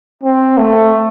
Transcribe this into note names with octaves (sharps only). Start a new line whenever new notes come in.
C4
A3